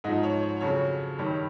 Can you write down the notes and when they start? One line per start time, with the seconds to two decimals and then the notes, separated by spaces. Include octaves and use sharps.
0.04 G#2 D#4 D#5
0.08 F3
0.23 C#5
0.43 C#5
0.61 F2 C#3 F#3 C#5
1.18 G2 D#3 G3 C#5